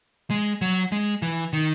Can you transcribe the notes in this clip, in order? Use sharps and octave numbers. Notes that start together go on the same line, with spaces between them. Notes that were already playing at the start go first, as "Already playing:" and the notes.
G#3
F#3
G#3
E3
D#3